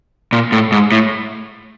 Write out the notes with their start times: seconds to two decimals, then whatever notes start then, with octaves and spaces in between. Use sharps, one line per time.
0.33 A#2
0.52 A2
0.72 G#2
0.92 A2